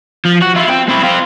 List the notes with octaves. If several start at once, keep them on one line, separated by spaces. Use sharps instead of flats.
F3
F#4
E4 F4
C4
C4 E4
C4 F4